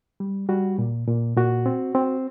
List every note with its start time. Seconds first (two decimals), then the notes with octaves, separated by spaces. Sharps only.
0.20 G3
0.49 G3 F#4
0.78 A#2
1.08 A#2
1.37 A#2 F#4
1.66 C4
1.95 C4